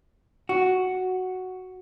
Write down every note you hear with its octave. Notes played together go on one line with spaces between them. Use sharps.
F#4